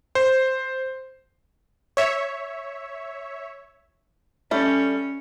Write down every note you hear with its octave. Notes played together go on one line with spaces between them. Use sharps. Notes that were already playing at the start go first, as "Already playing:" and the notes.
C5
C#5 E5
G3 A3 C#4 A4